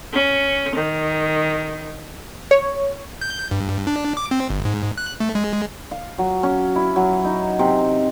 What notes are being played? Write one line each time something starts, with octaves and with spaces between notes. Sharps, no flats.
C#4
D#3
C#5
G6
G2
D4
D6
C4
G1
G#2
F#6
A3
G#3
F5
F#3
C#4
E4
F#3
D#4
C3